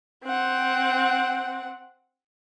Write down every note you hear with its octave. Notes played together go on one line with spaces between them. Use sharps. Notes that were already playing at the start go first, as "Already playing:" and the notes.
C4 F#5